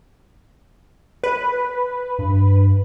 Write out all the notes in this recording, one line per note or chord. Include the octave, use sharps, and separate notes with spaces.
B4
G2